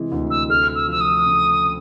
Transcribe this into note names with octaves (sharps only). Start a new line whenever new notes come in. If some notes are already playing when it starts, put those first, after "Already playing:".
Already playing: C3 E3 G#3
D2
E6
A3 F6
E6
F3 E6
D#6
C#3